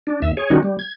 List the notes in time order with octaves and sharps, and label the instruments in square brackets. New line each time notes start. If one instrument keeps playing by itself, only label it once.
[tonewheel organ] D4
D#2 E5
G#4 C#5
D#3 G3 C#4 D#4 F#4
G3
G#6